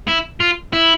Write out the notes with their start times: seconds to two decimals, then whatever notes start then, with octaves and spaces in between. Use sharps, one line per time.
0.08 E4
0.40 F4
0.73 E4